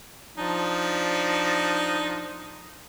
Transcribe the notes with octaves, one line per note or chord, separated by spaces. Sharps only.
F3 D4 D#4